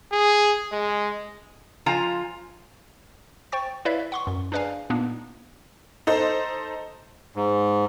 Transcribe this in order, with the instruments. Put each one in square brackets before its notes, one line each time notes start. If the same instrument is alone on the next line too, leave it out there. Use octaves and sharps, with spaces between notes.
[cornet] G#4
G#3
[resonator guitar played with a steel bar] F3 F4 G#5 A#5
[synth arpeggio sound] C5 G5 C#6 A6
E4 B4 C#5 D5 E5 F5
F#5 C6 C#6
F#2
D4 G#4 B4 D5 F5 G#5
A#2 A#3 B3 D4 D#4
[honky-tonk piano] D#4 A4 C5
[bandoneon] G#2